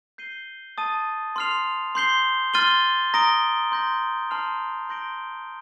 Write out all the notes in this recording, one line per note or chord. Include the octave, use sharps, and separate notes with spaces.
G6 C7 D#7 G7
A5 D#6 A6 D#7
C6 F6 C7 F7
C6 G6 C7 G7
C6 F6 A6 D#7 G7
A#5 D#6 A#6 D7 G7
C6 G6 A#6
A5 C6 F6 C7 F7
C6 G6 A#6 D7 G7